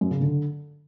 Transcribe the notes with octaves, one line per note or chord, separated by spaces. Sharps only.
F#2
C#3
D3